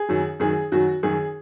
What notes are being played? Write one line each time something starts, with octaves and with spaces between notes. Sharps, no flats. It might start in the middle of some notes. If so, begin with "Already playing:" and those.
Already playing: G#4
F#2 D#3 F#3
F#2 D#3 F#3 G#4
F#2 D#3 F#3 F#4
F#2 D#3 F#3 G#4